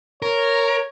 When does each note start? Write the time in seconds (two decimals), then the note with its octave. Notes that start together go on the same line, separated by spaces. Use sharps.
0.22 A#4 C#5